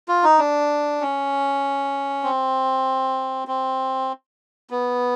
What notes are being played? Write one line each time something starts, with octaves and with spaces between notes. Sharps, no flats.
F4
D#4
D4
C#4
C4
C4
B3